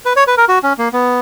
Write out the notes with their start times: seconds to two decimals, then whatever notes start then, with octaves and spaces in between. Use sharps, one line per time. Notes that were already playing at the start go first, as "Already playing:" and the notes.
0.05 B4
0.16 C#5
0.27 B4
0.37 A#4
0.49 F#4
0.63 C#4
0.78 A#3
0.93 B3